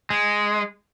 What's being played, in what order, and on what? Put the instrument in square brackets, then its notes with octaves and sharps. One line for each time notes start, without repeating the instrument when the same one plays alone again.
[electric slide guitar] G#3